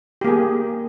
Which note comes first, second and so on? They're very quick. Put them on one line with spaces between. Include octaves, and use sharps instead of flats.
G4 A#3 G#4